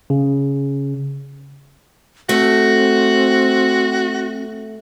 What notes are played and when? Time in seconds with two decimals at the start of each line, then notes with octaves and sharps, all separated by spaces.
0.10 C#3
2.29 A3 C4 F#4